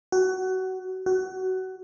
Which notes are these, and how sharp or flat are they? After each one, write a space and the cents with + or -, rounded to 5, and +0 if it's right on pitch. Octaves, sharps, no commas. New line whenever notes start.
F#4 +20
F#4 +20